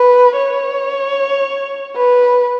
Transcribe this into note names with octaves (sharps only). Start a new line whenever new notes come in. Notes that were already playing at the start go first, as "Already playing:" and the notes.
Already playing: B4
C#5
B4